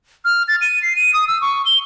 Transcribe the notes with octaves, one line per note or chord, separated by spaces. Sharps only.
F6
A6
D#7
C7
D#7
D#6
E6
C#6
G7